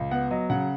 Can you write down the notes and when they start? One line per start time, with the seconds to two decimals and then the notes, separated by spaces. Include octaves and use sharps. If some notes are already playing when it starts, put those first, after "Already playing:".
Already playing: C#2
0.11 B3 F#5
0.31 F#3 D#5
0.50 C#3 F#5